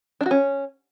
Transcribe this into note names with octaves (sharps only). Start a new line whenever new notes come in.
D4
F#4
C#4